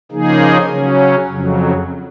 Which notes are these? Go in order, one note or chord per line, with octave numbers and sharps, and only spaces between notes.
C#3 F3 A#3 D#4 G#4
C#3 F#3 C#4
F2 C#3 F#3